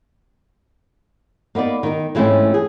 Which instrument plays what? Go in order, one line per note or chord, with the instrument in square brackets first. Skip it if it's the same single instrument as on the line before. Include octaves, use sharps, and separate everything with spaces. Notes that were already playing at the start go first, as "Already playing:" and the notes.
[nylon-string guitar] A#3 B3 D#4 D5
D#3 D#4
G#2 E3 A3 C4 C#4
G#4